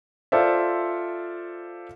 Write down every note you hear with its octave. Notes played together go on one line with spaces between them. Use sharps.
F4 A4 C5 D5 E5